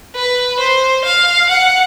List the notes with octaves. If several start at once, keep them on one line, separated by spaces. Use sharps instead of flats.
B4
C5
F5
F#5